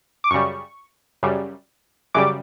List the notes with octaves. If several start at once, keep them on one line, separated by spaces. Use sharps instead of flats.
D6
F#2 C#3 G3 C#6
F#2 C#3 G3
F#2 C#3 G3 D6